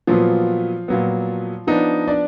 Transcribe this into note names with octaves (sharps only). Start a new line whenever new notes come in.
A#2 F3 F#3 B3 F4
A#2 F#3 B3
F3 B3 D4 D#4
D4 D5